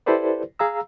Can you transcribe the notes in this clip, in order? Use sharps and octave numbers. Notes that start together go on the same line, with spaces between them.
E4 G4 A4 B4 C5 D5
G#4 F5 A#5 E6